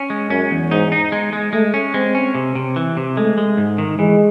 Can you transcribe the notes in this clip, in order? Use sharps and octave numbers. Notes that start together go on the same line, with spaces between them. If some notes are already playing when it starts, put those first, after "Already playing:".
Already playing: C#4
G#3
F#2 C#4
E2
G#2 D#4
D#4
G#3
G#3
G#3 A3
C#4
G#3 C4
C#4
C3
C3
E3
C3
G#3 A3
G#3
G#2
D#3
E3 G#3